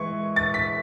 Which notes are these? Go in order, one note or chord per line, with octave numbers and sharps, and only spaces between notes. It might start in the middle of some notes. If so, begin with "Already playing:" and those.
Already playing: E3 G#3 C#6
A6
B6